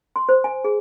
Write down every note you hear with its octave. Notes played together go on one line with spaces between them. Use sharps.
C6
C5
G#5
G#4